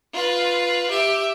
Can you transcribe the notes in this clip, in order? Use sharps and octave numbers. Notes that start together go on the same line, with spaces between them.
F4 B4
G4 E5